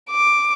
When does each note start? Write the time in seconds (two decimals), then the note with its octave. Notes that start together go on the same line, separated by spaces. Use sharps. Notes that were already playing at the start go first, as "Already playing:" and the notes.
0.11 D6